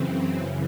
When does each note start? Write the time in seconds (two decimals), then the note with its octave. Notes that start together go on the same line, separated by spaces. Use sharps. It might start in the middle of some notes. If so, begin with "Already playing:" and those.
Already playing: F#2 C#3 E3 C4